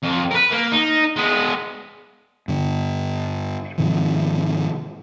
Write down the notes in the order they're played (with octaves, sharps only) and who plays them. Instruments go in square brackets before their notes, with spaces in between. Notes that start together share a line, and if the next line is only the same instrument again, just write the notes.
[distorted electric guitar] F2
A#4 B4
A#3
D#4
G#3 B3
[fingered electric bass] G2 D3
G#2 C3 D#3 F3